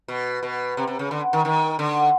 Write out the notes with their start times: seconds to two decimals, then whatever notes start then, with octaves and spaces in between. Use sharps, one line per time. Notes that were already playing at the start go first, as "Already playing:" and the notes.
0.08 B2
0.43 B2
0.77 C3
0.88 C3
0.99 C#3
1.11 D3
1.33 D#3
1.45 D#3
1.79 D3